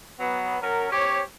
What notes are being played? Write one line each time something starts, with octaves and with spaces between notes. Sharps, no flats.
F#3 B3
F#3 C#4 A#4
C4 G4 C#5